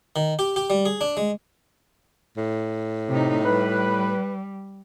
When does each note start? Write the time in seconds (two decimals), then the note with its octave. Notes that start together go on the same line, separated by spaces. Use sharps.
0.16 D#3
0.39 G4
0.56 G4
0.70 G3
0.85 G#4
1.01 D4
1.17 G#3
2.37 A2
3.09 C3 D#4
3.45 G3 B4